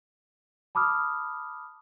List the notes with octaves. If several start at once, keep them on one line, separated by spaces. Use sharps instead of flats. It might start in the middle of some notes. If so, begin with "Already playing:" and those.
A5 B5 D6 D#6 F6